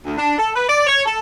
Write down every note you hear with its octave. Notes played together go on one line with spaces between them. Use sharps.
D2
D4
A4
B4
D5
C#5
A4